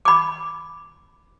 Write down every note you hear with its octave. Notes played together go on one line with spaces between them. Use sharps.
B5 D6